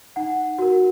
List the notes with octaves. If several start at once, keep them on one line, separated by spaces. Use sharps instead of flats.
D#4 F#5
F#4 A#4